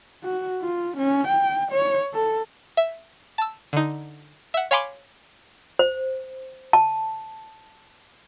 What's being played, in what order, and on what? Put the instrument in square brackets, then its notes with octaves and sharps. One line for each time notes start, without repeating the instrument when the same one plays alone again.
[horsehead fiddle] F#4
F4
C#4
G5
C#5
A4
[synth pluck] E5
A5 E6
D3 D#4
E5 F#5
C#5 F5 G#5 B5 C6 D6
[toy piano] C5
A5